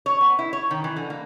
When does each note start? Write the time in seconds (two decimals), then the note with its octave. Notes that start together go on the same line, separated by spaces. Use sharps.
0.06 C#5
0.21 B3
0.39 E4
0.53 C#5
0.71 D#3
0.84 E3
0.96 D3
1.10 A#3